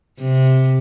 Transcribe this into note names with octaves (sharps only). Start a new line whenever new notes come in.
C3